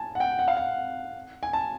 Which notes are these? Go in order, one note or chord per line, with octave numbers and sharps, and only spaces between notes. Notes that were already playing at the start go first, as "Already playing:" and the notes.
Already playing: G#5 A5
F#5
G5
F#5
F5
F#5
G#5
A5